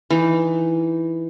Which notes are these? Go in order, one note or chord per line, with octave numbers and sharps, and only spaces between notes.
E3 D#4